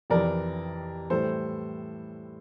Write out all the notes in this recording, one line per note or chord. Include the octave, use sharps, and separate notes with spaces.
F2 C3 E3 A#4 D5
A2 E3 G3 A4 C5